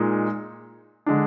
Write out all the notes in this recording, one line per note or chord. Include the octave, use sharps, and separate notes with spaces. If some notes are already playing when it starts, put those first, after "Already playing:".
Already playing: A#2 G#3 D#4
D3 G#3 D4